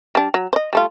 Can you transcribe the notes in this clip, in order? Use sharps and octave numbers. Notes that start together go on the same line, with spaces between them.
G3 D4
F#3
C5 D#5
G3 A3 F4